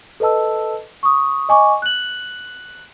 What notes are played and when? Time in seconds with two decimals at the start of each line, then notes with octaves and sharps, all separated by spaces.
0.20 A4 B4 D#5 A5 E6
1.03 C#6 D#6
1.49 D#5 G#5 C#6 D6
1.82 F#6 F#7